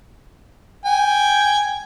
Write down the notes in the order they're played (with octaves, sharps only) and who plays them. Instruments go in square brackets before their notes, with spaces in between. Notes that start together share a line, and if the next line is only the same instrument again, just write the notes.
[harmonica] G5 G#5